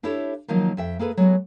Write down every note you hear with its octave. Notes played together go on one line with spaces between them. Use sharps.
D4 E4 G4 A4 C#5
D#3 F3 F#3 A#3 D#4
F2 E5 G5
A#3 G#4 A4 B4
F#3 G#3 B3 F#4